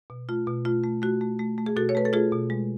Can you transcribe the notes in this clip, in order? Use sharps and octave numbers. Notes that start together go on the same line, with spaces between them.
B2
A3 F4
B2
A3 F4
A3
A3 F#4
A3
A3
A3
G#4
B2 F#4 A4
C#5
A3 B4
A4
A3 F4 G#4
B2
G#3